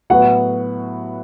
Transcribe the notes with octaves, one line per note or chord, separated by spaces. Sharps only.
A2 F#3 B3 F#4 B4 F#5